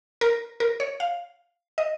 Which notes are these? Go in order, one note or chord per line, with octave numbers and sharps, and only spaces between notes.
A#4
A#4
C#5
F5
D#5